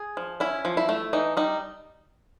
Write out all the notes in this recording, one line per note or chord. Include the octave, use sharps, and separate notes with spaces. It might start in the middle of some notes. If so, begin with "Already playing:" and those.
Already playing: G#4
F3
C#4 E4
F3
E4
A3
E3 D#4
G3 D#4